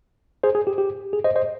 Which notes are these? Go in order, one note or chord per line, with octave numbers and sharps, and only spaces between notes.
G#4 C5
G#4
G4
G4
G#4
C5 D#5
C5 D#5